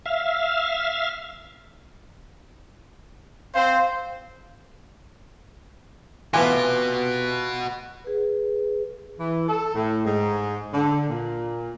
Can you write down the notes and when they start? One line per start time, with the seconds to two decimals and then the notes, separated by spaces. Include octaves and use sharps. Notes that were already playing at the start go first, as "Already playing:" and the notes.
0.06 E5 F5
3.55 C4 C5 F5
6.34 A2 E3 B3 F4 F#4 B4 G#5
6.52 C3
8.04 G#4 B4
9.19 E3
9.48 A4
9.75 A2
10.06 G#2
10.74 D3
11.09 A#2